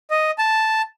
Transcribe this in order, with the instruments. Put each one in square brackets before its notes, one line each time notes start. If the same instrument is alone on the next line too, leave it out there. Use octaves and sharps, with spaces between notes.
[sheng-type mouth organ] D#5
A5